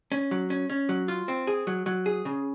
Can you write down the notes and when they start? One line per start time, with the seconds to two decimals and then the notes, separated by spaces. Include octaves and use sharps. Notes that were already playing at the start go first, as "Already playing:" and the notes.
0.12 C#4
0.31 F#3
0.50 C#4
0.70 C#4
0.89 F#3
1.08 F4
1.28 C4
1.47 G#4
1.67 F#3
1.86 F#3
2.06 G#4
2.25 C#3